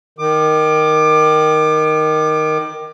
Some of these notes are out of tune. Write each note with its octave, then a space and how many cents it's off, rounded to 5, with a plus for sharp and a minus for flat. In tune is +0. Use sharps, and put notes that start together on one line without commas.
D#3 +0 D6 +25